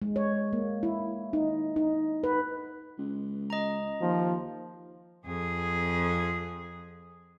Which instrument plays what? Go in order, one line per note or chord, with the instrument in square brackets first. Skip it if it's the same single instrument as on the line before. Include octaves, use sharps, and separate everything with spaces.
[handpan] G#3
C#5
A#3
E4
D#4
D#4
B4
[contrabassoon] C#2
[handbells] D#5 A#5
[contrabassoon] D#2 [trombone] F3
[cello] F2 G#4